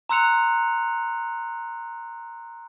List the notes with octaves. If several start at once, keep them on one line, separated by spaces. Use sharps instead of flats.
A#5 C6 E6 F#6 C#7 F7